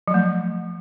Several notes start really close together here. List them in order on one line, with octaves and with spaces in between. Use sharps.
F#3 F3 A3